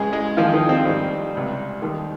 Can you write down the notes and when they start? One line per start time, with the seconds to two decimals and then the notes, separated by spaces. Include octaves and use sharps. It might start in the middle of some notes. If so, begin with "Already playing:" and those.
Already playing: C#2 C#3 G#3 G#4
0.13 G#3 G#4
0.37 D#2 D#3 F3 G#3 F4
0.53 D#3 D#4
0.69 C4
0.85 G#2 D#3 G3 C4
1.34 C#2 C3 G3
1.82 D#2 D#3 G3